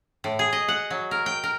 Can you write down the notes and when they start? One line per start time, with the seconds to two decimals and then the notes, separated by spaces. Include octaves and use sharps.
0.24 A2
0.39 G#4
0.53 D#5
0.68 F#5
0.91 F#3
1.11 A#4
1.26 G5
1.44 A#4